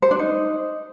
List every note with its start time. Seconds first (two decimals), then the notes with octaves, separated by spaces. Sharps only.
0.02 C5
0.11 D4
0.19 D#4